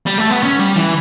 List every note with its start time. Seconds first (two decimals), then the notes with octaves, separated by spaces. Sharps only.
0.06 G3
0.18 A3
0.30 B3
0.43 C#4
0.59 G3
0.76 E3